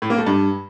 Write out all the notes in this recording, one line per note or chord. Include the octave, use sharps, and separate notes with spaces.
A2
A#3
A3
G2